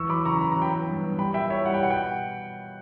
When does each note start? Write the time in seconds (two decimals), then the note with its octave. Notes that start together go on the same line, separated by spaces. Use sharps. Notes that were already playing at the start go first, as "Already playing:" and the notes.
Already playing: E2 C#6 E6
0.09 F#3 B5 D6
0.25 C#3 A#5 C#6
0.41 E2 B5
0.51 F#3 A#5
0.62 G5 B5
0.72 B3
0.88 G2
1.04 G2
1.18 G3 G5 B5
1.34 A#2 E5 G5
1.50 E4 C#5 E5
1.66 G3 F#5
1.74 G5
1.82 B2 F#5
1.91 G5